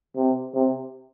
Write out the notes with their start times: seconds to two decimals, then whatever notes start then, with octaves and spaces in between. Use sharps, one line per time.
0.16 C3
0.54 C3